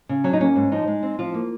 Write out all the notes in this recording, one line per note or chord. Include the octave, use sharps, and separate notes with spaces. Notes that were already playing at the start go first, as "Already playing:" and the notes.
C#3
F#3 C#4
D#4
A#3 C#4
G#2
F3 D#4
G#3
C4
F3 F4
A#3